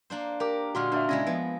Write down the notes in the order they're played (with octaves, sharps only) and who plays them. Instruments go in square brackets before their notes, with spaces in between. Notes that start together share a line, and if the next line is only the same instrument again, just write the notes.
[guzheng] A#3 D4 C5
[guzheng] G4 [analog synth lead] A#4 [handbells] A#5 D6
[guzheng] A#2 D3 G#3 [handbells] F#4 C6 F6
[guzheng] A#3 [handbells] D4 D5 E5 [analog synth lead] F6
[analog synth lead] C#3 [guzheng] G#3 E4 G#4 [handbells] A#6
[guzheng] F3 [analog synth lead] B3